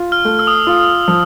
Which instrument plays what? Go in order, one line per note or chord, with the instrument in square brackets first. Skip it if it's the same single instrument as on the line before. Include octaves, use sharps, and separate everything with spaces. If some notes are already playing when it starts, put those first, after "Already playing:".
Already playing: [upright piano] F4
[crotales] F6
[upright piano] A3
[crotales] E6
D#6
E6
[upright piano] F4
F3